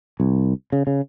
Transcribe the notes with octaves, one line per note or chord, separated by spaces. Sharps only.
C2
C#3
C#3